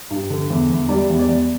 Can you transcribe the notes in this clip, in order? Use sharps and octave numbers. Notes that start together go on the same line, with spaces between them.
G2
D3
E2
E2
G3 D5
E2
D5
E2